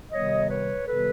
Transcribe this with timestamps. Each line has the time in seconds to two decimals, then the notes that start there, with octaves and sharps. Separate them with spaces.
0.12 C3 D#3 G3 B3 C#5 D#5
0.50 B4 C#5
0.87 C3 D#3 G3 B3 A4 B4